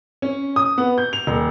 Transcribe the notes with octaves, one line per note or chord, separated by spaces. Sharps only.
C#4
D#6
B3
G6
F7
D#1